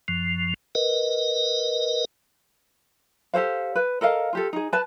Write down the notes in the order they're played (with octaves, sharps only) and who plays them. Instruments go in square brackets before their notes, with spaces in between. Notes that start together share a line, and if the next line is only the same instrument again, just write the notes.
[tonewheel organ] F#2 F3
A#4 B4 D#5
[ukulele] G4 A4 C5 F5
B4
A4 A#4 D#5 F5
F4 G4 A4
D#4 G#4
B4 A5